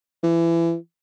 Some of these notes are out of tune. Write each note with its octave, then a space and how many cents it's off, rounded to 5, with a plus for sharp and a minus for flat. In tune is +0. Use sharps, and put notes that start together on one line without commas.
E3 +25